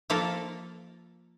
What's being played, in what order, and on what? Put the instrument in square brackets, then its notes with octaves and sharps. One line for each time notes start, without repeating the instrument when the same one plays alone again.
[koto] F3 A#3 F4 A4 A#4